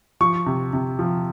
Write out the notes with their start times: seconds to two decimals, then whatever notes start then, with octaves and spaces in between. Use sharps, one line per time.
0.21 F3 C#6
0.46 C3
0.73 C3
0.99 F3